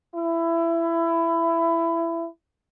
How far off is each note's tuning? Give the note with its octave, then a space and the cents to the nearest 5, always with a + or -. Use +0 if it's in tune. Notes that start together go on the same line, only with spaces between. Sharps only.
E4 +20